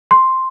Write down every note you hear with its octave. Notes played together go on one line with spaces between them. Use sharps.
C6